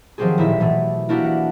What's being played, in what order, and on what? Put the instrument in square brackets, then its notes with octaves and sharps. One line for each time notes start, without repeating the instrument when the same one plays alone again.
[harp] D#3 F3 F#3 C4 G4 G#4
D#1 A1 E4 B6
B2 E3 A3
A#3 D4 E4 F#4 G4 A#4
F#5